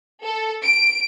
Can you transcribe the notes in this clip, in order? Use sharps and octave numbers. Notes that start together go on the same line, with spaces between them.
A4
D7